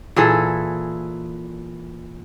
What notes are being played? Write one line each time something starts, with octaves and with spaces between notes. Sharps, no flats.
A#2 E3 G#4 A4